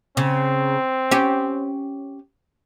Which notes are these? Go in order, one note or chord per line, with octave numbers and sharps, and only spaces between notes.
C#3 C4
C#4 G4